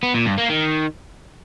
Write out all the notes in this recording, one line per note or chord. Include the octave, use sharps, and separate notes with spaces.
B3
A#2
G2
A#3
D#3